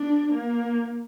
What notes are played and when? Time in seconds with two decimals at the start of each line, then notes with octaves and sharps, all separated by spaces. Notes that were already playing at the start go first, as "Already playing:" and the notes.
Already playing: D4
0.32 A#3